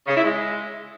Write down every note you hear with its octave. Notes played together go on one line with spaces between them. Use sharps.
C#3
E4
G#3